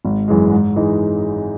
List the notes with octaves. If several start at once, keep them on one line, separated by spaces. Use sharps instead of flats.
G#1
F#2 E3 G#3
G#2
E3 G#3 D#4